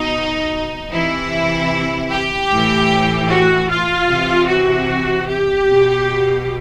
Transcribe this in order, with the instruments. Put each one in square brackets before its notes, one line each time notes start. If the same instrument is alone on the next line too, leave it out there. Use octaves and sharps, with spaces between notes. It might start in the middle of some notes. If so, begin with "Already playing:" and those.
Already playing: [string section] B2 D#4
C3 E3 E4
G4
A2 E3
F#4
F4
C3 E3
F#4
G4
B2